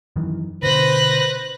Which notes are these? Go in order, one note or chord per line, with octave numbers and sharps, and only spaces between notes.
F#2 D#3 E3
B2 D3 B4 C5 F#6 A#6